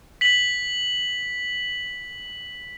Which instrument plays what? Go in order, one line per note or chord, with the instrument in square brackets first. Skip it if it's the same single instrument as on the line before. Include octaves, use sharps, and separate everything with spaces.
[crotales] B6 F#7